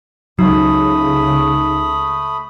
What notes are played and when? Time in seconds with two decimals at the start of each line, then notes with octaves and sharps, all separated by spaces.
0.39 C#2 C#3 F#3 A3 D#4 B5 D#6